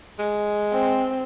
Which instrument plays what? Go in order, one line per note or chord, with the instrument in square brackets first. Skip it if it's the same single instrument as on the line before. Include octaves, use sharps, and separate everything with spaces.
[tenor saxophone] G#3
[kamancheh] C4